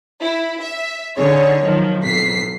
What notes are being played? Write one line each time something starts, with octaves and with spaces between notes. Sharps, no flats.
E4
E5
D3 D#4 G#4 C#5
D#3 F3 F#3
B1 F2 B6 C7